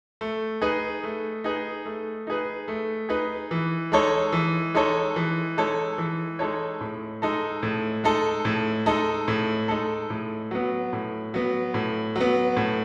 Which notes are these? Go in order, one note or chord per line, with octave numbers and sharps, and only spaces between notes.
A3
D#4 G#4 B4
A3
D#4 G#4 B4
A3
D#4 G#4 B4
A3
D#4 G#4 B4
E3
G#3 D#4 A4 C#5
E3
G#3 D#4 A4 C#5
E3
G#3 D#4 A4 C#5
E3
G#3 D#4 A4 C#5
A2
G#3 D#4 A4
A2
G#3 D#4 A4
A2
G#3 D#4 A4
A2
G#3 D#4 A4
A2
F#3 B3
A2
F#3 B3
A2
F#3 B3
A2